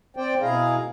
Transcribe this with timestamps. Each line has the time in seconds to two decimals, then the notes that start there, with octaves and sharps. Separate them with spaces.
0.17 C4 C5 D5 G5
0.41 B2 E4 G#4 F5 A#5